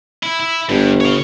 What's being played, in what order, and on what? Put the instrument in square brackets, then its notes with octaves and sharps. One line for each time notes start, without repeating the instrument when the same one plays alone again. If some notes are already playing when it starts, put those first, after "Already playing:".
[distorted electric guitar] E4
E4
[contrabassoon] G1 [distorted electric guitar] G2
[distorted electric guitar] C#5 F5